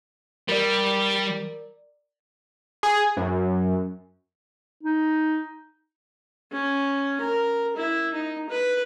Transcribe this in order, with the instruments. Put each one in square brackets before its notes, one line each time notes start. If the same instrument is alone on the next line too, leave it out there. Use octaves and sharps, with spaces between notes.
[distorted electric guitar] G3 [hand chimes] A#4 D5
[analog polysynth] G#4
F#2
[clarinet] D#4
[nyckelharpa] C#4
A#4
E4
D#4
B4